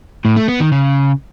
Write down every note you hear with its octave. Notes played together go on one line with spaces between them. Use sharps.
A2
A3
B3
D#3
C#3